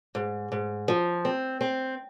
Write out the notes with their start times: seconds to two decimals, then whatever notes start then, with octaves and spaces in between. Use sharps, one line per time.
0.15 G#2
0.52 G#2
0.88 F3
1.25 C4
1.61 C4